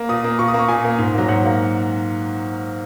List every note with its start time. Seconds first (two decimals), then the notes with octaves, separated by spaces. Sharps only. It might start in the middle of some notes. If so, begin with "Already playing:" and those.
Already playing: A#3
0.09 A#2 D#6
0.24 A#3
0.39 A#2 C#6
0.48 D#6
0.54 A#3 C#6
0.68 A#2 G#5
0.84 A#3
0.99 G#2
1.14 F#3 A#3
1.28 G#2 F#5
1.43 F#3 A#3